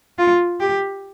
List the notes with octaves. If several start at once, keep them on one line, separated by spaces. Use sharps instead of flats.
F4
G4